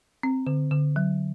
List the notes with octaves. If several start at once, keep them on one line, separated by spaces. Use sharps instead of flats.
C4
D3
D3
F#3